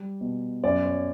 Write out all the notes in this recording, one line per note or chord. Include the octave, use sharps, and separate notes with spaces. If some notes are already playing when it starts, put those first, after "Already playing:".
Already playing: G3
B2
F#2 D5
C#5